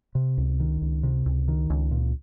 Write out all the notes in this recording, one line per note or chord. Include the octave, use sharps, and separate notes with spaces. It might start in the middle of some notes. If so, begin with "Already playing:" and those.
C3
C#2
D#3
C#2
C3
C#2
D#3
C#2
A#2